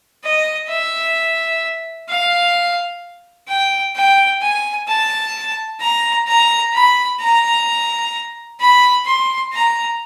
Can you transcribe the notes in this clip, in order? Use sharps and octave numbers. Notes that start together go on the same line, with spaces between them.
D#5
E5
F5
G5
G5
G#5
A5
A#5
A#5
B5
A#5
B5
C6
A#5